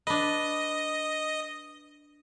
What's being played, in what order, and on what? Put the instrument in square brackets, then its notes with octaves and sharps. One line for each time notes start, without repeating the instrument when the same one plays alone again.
[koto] D4 B4 [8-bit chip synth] D#5